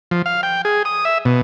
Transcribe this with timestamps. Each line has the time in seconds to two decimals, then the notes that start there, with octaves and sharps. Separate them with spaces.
0.11 F3
0.26 F5
0.43 G5
0.65 G#4
0.85 D#6
1.05 E5
1.25 B2